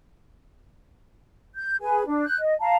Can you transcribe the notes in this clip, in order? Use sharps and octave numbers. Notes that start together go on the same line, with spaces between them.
G6
G#4 B4 G#5
D4
F#6 G6
D#5
F5 A5 A#5